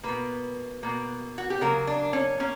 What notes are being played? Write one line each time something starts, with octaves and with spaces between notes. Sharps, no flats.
B2 A#3 B4
B2 A#3
F#4
G4
C#3 F#3 A#3 A#4
D4
C#4
A#3 C#4